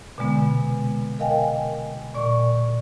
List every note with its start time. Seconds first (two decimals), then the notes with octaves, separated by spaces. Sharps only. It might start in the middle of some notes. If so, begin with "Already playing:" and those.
0.18 B2 D3 G#3 B3
0.39 C3
1.19 A#4 D#5 F5 G5 G#5
2.14 A#2 D5 C#6